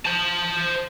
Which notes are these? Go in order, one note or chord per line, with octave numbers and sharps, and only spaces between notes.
C5 A5